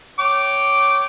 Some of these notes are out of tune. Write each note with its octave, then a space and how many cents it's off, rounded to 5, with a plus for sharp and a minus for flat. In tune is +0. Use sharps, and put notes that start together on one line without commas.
C#5 +0 G5 -30 D6 +0